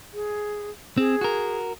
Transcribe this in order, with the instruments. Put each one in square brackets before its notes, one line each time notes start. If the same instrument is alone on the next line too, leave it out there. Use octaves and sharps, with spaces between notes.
[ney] G#4
[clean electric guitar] C4 [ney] G#4
[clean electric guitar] F#4 A#4